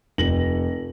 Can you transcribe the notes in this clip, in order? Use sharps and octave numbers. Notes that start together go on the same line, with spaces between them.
F1 A#6 F#7